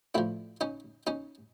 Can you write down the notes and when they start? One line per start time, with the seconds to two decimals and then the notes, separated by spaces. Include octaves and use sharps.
0.15 A2 F3 D4 E4
0.61 C#4 D#4
1.07 C#4 D#4